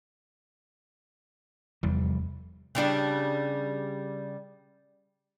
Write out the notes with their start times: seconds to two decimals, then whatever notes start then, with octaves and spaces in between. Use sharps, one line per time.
1.83 F1 E2 G3
2.75 C#3 G3 D4